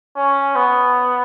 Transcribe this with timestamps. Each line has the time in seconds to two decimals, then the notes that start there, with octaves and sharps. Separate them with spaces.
0.17 C#4
0.56 B3